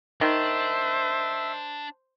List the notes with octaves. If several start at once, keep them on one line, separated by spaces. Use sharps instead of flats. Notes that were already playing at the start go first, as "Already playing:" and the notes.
D#3 D4 C5 E5